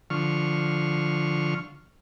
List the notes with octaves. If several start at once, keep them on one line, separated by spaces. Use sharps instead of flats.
D3 F3 C#6 F6